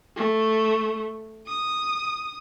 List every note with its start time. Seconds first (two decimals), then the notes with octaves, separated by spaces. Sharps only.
0.16 A3
1.46 D#6